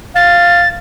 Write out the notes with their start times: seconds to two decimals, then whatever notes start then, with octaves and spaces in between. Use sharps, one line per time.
0.16 F5 A6